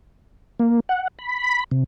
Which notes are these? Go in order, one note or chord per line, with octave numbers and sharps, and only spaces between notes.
A#3
F#5
B5
C3